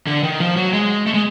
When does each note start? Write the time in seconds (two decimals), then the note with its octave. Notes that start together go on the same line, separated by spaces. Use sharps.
0.07 D3
0.23 D#3
0.40 F3
0.56 F#3
0.73 G#3
1.06 A3
1.14 G#3